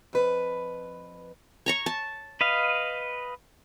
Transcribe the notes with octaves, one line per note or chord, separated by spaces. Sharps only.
F2 B4
C#5 A#5 C#6
A5
B4 D#5 F5